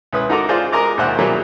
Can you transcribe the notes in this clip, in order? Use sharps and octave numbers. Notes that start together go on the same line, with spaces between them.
C#2 E4 B4 D#6
D#4 F#4 A4 A#4 A#5 D6
F4 G#4 C5 D5
G#3 G#4 A#4 D#5 A#5 D6
D#2 A#2 E4 C5 F#5 F#6
F#3 G3 A#3 E4 G#4